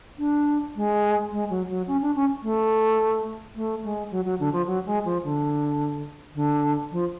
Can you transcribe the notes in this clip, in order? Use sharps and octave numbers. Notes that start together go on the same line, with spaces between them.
D4
G#3
G#3
F#3
F#3
C#4
D4
C#4
A3
A3
G#3
F#3
F#3
D3
F3
F#3
G#3
F3
D3
D3
F3